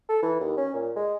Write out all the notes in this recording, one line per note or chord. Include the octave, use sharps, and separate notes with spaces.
A4
E3
D#2
C#4
A#2
G#3